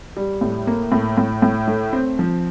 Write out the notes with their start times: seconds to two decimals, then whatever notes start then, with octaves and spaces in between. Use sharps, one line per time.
0.17 G3
0.41 A2
0.67 A#3
0.92 A2
1.17 A2
1.42 A2
1.68 A3
1.93 C4
2.19 F3